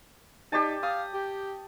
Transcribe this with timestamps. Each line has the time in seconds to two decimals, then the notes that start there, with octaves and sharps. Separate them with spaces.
0.52 D#4 G4 D5 A5
0.83 F5 D#6
1.14 G4